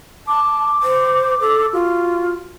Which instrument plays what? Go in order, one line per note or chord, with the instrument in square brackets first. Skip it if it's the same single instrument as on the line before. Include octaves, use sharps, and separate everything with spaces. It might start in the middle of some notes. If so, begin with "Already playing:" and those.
[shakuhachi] A5 [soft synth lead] D6
[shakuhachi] C5
A4
[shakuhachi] F4 [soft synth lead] F#4